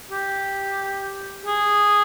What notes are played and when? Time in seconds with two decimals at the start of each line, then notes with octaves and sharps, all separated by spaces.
0.11 G4
1.46 G#4